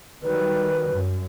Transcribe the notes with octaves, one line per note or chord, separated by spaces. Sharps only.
D#3 F#3 G3 B4
F#2